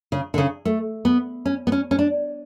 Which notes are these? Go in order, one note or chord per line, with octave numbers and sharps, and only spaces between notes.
C#3
D3
C#3
A3
B3
C#4
B3
C#4
C#4
D4